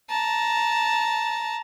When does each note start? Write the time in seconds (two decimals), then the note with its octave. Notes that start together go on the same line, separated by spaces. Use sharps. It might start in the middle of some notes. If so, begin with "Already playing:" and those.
0.10 A5 A#5